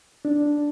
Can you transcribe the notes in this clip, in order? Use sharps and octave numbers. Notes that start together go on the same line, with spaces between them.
D4